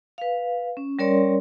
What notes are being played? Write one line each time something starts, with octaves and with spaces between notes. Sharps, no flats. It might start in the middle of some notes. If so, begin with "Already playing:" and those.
B4 F5
C#4
G3 C#4 A#4 C#5 D5 C6